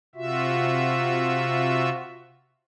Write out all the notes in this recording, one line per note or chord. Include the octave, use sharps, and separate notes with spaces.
C3 F4 F#4 E5